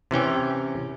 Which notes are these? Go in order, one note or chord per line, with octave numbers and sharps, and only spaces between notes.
C3 E3 C#4 G5